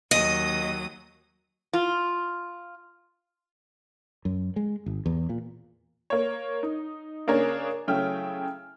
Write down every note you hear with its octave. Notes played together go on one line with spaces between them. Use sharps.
D#2 F#3 D#5 D#6
F4
F#2
G#3
G#1
E2
A#2
A#3 C#5
D#4
C#3 A#3 D4 G#4 A#4 C#5
C#3 F#3 A3 E4 G5 F6